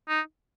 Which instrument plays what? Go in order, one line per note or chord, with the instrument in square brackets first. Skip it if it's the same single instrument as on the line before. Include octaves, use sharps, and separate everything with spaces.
[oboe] D#4